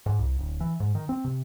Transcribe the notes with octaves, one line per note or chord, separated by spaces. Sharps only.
G#2
C2
D1
E3
G#2
D#3
C4
C3